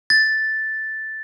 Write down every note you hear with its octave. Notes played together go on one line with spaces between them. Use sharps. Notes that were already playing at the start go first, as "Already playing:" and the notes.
A6